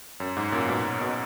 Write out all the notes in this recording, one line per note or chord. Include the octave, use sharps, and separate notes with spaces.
F#2
G#2
F#2 A#2
G#2 B2
B2